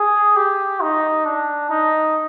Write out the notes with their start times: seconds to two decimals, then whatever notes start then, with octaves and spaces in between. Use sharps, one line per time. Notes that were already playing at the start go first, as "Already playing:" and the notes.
Already playing: G#4
0.36 G4
0.81 D#4
1.25 D4
1.70 D#4